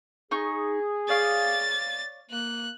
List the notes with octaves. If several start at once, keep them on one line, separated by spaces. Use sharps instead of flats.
D#4 G#4 C#6
C#5 D5 F5 A6
A#3 F#6